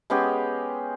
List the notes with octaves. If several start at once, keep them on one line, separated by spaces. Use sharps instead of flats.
G#3 B3 C#4 G4